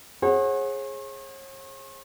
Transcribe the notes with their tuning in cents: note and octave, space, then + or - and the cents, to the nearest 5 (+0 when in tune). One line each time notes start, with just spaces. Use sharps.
G#4 +0 C#5 -45 F#5 +0